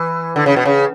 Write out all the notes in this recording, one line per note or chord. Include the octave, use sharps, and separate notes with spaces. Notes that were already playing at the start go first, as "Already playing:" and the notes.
Already playing: E3
D3
C#3
B2
C#3